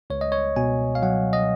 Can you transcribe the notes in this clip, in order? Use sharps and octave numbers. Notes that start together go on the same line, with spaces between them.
C#2 C#5
D#5
C#5
B2 G#5
F5
F#3 F#5
D#5